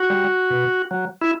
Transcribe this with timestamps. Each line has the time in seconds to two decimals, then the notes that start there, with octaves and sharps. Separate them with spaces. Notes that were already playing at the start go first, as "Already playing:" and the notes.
Already playing: F#4
0.10 G3
0.50 B2
0.91 F#3
1.21 E4